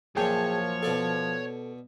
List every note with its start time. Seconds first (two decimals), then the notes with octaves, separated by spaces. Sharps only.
0.17 F#2 A#2 F3 F#3 G#4 C#5 G5 A5
0.82 B2 A4 D5 C#6